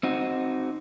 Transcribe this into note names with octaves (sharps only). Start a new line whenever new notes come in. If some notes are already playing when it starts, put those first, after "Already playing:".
C4 D#4 F#4